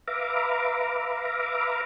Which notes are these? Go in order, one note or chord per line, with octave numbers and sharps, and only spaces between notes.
B4 E5 F5 A#5 D6